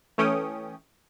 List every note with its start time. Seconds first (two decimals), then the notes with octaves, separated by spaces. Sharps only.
0.18 E3 A3 C#4 G5 D#6